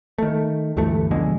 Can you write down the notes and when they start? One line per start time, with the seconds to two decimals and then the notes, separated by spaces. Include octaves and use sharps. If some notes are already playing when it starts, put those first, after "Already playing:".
0.18 D#3 A3
0.77 D2 G2 E3 A3
1.11 F2 B2 D3 G#3